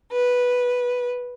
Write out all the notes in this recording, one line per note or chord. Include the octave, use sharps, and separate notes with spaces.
B4